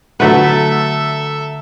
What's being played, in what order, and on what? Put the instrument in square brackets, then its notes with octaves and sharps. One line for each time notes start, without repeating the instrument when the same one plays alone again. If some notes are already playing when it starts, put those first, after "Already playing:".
[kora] D3 B4 [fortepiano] F#3 A3 F#5 [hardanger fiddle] A4 E5